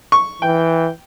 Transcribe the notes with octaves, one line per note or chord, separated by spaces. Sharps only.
C#6
E3 G5